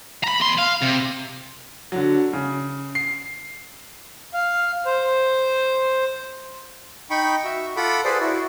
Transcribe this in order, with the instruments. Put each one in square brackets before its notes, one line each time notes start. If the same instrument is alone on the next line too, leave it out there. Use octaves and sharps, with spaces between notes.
[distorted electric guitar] A#5 B5
E2 C6
F5
C3
[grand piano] D3 F#3
C#3
C7
[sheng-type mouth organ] F5
C5
D#4 G5 B5 C#6
F#4 E5
F4 A4 F#5 B5 D6
G#4 A4 B4 C5 D5
E4 F#4